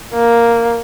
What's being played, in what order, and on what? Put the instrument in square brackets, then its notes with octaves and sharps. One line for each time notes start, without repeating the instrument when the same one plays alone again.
[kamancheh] A#3